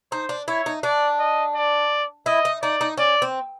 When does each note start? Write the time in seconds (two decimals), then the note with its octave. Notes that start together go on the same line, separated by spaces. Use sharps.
0.12 D#4 C5
0.29 D4
0.48 E4 C#5
0.66 D#4
0.83 D4 D5
1.19 D#5
1.55 D5
2.26 E4 D#5
2.45 D#4
2.62 D#4 D5
2.81 D#4
2.97 C#4 D5
3.22 C4